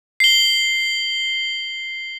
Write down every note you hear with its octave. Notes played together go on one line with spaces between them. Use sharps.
C7 G7